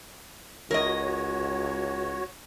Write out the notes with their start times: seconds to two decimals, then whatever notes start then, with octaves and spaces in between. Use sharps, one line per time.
0.71 C#2 F#4 A#4 C#5 D#5